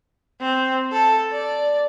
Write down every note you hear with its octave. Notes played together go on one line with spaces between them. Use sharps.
C4
A4
D5